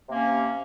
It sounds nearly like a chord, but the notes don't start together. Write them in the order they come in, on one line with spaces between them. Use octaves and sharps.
C3 A#3 C#4